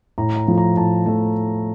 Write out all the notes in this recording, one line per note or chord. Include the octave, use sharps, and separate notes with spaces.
A2 A#5
A#5
F3 A3
A#5
A2 A5
F3 A3 A5